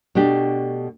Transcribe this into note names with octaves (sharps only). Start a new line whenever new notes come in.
B2 A3 D4 G4